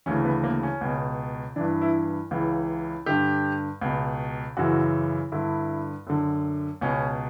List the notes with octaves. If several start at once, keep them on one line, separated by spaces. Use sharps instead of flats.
D2 C#3 E3 C#4
B3
A#3
C#4
C#2 B2
G2 E3 D4
E4
C#2 C#3 E3
G2 D3 G4
C#2 B2
F#2 C#3 E3 F#4
G2 D3 E4
F#2 D3
C#2 B2 C#4